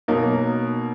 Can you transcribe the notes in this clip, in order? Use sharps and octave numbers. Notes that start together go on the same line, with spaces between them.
B2 F#3 A#3 D#4